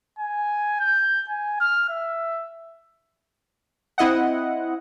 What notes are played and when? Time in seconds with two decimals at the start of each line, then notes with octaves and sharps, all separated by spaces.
0.19 G#5
0.80 G6
1.30 G#5
1.61 F6
1.90 E5
3.98 C4 E4 D#5 F#5